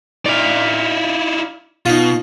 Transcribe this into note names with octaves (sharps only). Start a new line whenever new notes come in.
D#4 E4 D5 F5
B2 D#4 F4